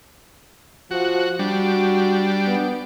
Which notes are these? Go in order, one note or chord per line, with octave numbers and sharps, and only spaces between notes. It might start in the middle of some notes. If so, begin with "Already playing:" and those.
F3 F#4
G3 D4 F#4
B3